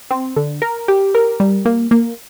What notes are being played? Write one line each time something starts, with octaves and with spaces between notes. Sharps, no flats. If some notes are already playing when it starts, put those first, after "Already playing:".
C4
D3
A#4
G4
A#4
G3
A#3
A#3